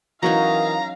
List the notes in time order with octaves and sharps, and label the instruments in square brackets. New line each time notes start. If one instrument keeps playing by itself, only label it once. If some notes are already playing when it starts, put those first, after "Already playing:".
[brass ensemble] E3 A#4 D#5 [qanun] F#3 C#4 D#4 [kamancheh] F5 [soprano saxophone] A#5